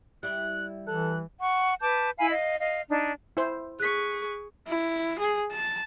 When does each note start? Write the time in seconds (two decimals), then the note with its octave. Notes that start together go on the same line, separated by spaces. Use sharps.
0.23 G3 E4 D5 F#6
0.87 E3 A4 F#6
1.41 F#5 C#6
1.81 B4 A5 D6 G6
2.18 E4 F5 G#5 B5
2.31 D#5 F5
2.60 D#5 F5
2.89 D4 D#4
3.37 E4 C5
3.80 G#4 C#6 F#6 B6
4.67 E4
5.19 G#4
5.51 A5